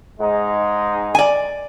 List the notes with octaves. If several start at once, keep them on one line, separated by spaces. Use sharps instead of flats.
G#2 G#3 D#4
D5 G#5